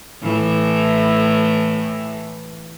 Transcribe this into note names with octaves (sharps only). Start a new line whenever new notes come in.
A2 E3